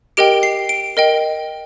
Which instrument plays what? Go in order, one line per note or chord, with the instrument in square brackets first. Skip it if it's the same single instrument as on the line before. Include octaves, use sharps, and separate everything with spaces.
[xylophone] G4 A#4 D#5 G5 D7
C7
D7
A#4 D#5 G5